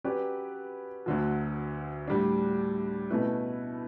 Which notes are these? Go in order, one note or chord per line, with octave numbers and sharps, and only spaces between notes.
F#3 C#4 G4 B4 D5
D2 D3 F#3
A2 G3 D4
B2 A3 C#4 E4 B4